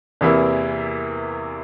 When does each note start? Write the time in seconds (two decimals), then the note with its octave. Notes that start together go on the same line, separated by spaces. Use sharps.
0.21 E2 C3 E3 A#3 E4